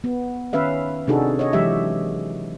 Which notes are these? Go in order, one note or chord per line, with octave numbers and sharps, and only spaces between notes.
B3
D#3 C#4 B4 E5 F5
C3 D4 D#4 F#4 G#4 A4
C#5 D#5
E3 F#3 G#3 G4 E5